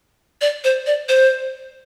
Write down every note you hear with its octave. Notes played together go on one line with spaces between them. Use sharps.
D5
C5
D5
C5